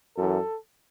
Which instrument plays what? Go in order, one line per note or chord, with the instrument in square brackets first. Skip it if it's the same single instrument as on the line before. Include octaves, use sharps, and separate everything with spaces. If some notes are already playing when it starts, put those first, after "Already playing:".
[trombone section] F#2 E3 A4